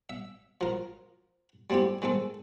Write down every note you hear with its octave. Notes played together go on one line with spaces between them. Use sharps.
E5
F3 A#4
G3 A3 C4 E4 G4
D#3 G#3 C4 A4